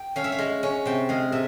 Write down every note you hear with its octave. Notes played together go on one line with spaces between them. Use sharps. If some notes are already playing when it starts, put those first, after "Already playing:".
Already playing: G5
C#4 F5
E5
F5
G#3
C#4
C3 G5
G#3 F5
C3 E5